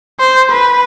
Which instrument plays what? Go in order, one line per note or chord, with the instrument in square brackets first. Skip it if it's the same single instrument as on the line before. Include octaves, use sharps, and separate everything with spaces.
[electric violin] C5
B4